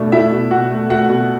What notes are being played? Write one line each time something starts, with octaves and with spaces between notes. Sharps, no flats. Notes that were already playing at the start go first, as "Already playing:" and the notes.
Already playing: B2 A3 D4
A3 E4 E5
B2
B2 F#4 F#5
A3
A3 F#4 F#5
B2